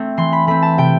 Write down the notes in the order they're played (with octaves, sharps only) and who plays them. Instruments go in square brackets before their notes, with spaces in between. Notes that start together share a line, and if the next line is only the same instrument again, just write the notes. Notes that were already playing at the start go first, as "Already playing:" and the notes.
Already playing: [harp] A3 C4
E3 C6
B5
A3 C4 B5
A5
C3 G5